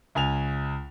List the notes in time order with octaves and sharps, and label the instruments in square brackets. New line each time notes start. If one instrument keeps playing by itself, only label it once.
[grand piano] C#2 G#5 F7